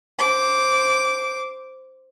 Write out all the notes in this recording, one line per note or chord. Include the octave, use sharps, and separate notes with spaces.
C5 D6